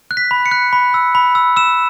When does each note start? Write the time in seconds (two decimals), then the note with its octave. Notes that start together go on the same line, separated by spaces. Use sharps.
0.11 F#6
0.17 B6
0.31 B5
0.46 C#7
0.51 F#6
0.73 B5
0.94 E6
1.15 B5
1.35 E6
1.56 E6 E7